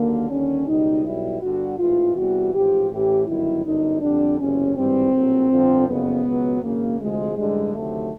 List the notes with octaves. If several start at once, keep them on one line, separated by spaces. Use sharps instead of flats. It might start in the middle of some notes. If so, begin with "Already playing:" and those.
Already playing: D#2 D3 F#3 A#3
D#2 D3 G3 C#4
C#2 B2 G3 D#4
B1 B2 G3 E4
G1 G2 D3 G3 F#4
A1 G#2 E3 F4
E2 C3 E3 G3 F#4
A1 G#2 F3 G4
A1 A2 E3 G4
G1 F#2 D#3 F#3 E4
G1 F#2 D3 D#4
F2 D3 G3 D4
F#1 E2 C3 C#4
G#1 G2 E3 G3 C4
A#1 A2 F#3
G1 F2 D3 F3
F#1 F2 C#3 B3
C#2 B2 F#3
G#1 F#2 C#3 A#3
D2 C3 F3 G#3
A1 G2 D3 G3 G#3
D2 C3 D#3 F#3 A3